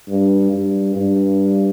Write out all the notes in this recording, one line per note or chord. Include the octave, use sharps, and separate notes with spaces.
G2
G2
G2